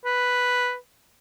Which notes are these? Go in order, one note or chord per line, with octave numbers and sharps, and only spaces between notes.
B4